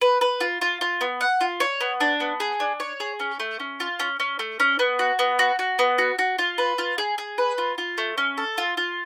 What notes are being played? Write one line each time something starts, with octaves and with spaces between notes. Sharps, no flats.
B4
B4
F4
F4
F4
B3
F#5
F4
C#5
B3
D4
B3
G#4
D4
C#5
G#4
C#4
A3
C#4
F4
C#4
C#4
A3
C#4
B3
F#4
B3
F#4
F#4
B3
F#4
F#4
F4
B4
F4
G#4
G#4
B4
F4
F4
A3
C#4
A4
F4
F4